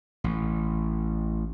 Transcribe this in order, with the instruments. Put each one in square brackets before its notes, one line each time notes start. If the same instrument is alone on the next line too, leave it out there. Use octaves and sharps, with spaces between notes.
[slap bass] A1